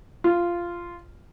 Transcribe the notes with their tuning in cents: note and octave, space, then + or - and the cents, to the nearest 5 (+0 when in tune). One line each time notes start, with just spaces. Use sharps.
F4 -10